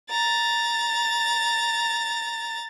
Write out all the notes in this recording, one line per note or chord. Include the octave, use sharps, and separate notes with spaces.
A#5 A6